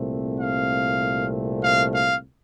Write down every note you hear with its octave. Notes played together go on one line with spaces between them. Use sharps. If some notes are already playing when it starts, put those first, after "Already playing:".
Already playing: C2 A#2 A3 C4
F5
F5
F5